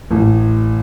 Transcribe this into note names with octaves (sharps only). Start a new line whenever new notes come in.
A1